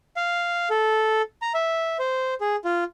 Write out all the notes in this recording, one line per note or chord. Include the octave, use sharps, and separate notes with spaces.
F5
A4
A#5
E5
C5
G#4
F4